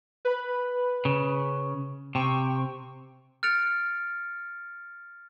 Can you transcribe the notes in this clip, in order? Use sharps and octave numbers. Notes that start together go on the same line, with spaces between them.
B4 B5
C#3
C3 G5 C#6
F6 F#6 A6 C#7 D7 F7